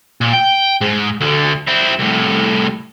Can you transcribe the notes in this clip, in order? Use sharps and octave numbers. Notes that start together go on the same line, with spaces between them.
A#2
G5
G#2
D2 D3
C4 E4
C2 A2